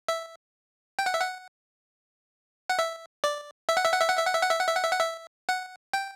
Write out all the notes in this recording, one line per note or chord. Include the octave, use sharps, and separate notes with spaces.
E5
G5
F#5
E5
F#5
F#5
E5
D5
E5
F#5
E5
F#5
E5
F#5
E5
F#5
E5
F#5
E5
F#5
E5
F#5
E5
F#5
E5
F#5
G5